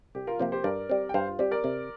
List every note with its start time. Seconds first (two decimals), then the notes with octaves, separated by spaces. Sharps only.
0.15 C2 G4
0.27 F4 A#4
0.39 C3 F3 A#3 G4 C5
0.52 G4 C5
0.64 G2 A#4 D5
0.89 G3 C4
1.09 G5
1.14 G2 C5 F5
1.27 F4
1.39 G3 C4 G4
1.51 A#4 D5
1.64 C3